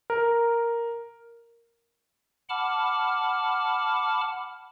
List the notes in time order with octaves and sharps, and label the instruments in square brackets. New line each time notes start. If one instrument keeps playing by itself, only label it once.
[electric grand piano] A#4
[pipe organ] F#5 A5 B5 D6 F6